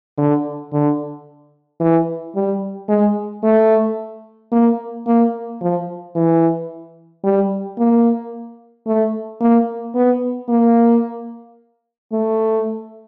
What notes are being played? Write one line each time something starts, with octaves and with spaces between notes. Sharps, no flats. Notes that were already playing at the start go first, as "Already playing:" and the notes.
D3
D3
E3
G3
G#3
A3
A#3
A#3
F3
E3
G3
A#3
A3
A#3
B3
A#3
A3